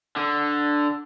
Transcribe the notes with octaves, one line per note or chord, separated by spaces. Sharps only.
D3